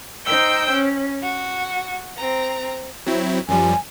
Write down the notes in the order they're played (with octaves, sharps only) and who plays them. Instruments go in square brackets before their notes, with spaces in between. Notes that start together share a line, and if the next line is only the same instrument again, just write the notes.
[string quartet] D#4 C5 G5 E6 G6
C#4
F#4
C4 A#5
[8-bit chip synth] F#3 C4 E4
[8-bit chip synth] F#2 F3 G3 [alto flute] G#5